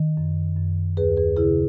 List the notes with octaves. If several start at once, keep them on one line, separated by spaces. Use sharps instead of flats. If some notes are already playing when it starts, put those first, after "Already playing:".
Already playing: D#3
F#2
F#2
D#2 G#4 B4
G#4 B4
C#3 E4 G#4